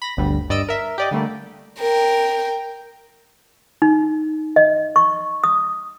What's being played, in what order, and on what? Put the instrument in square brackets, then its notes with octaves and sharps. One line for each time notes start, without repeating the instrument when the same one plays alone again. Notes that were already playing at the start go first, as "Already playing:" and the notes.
[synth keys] B5 A#6
G1 D2 D3 G3
G2 D5 D#5 E6 D7
A#4 E5
G4 D5 D#5
D3 G3 A3 A#3
[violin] A#4 G5
[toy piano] D#4
D#5
C#6
D#6